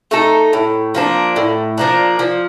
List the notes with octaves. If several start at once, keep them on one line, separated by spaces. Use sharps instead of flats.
A3 D#4 A4
A2
F3 A#3 D4
A2
F3 A#3 D4
F3